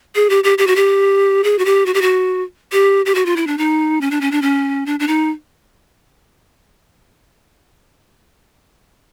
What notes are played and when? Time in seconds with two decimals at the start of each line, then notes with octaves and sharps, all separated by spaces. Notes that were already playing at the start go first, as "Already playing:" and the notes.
0.15 G#4
0.30 G4
0.44 G4
0.58 G4
0.67 F#4
0.76 G4
1.44 G#4
1.59 F#4
1.65 G4
1.86 F#4
1.94 G4
2.02 F#4
2.72 G4
3.06 G4
3.15 F#4
3.26 F4
3.36 E4
3.47 D4
3.58 D#4
4.01 C#4
4.11 D4
4.21 C#4
4.31 D4
4.42 C#4
4.86 D4
5.00 D4
5.07 D#4